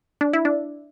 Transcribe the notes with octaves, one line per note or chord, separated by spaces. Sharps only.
D4
E4
D4